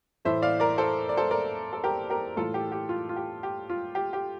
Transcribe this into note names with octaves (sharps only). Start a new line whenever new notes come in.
A2 E3 A3 C5 E5
D5 F5
A#4 D5
A4 C5
D5
A4 C5
A#4 D5
A4
G4 A#4
G4 A#4
A2 E3 A3 F4 A4
G4
G4
F4
F4
G4
G4
F4
G4
G4